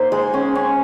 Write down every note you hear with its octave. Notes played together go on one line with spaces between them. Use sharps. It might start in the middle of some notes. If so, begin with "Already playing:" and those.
Already playing: A#3 D#4 C5
G#3
C#4
C#4